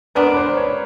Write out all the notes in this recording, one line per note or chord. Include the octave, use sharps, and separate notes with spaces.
G#3 B3 D4 A#4
B4
C5
C#5